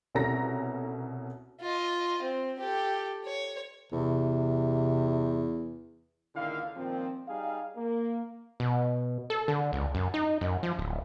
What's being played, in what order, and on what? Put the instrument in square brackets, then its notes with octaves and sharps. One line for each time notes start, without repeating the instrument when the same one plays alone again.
[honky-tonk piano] C2 B2 C#4 A4 A#5 A#6
[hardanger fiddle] F4 D#5
C4
G4 A4
C#5
[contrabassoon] E2 [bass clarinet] C3
[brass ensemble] C#2 A#2 D3 D#3 E4 F5
A#2 D#3 F3 C4
G3 D#4 G#4 F5
A#3
[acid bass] B2
A4
D3
C#2
F#2
D#4
F#2
F3
D1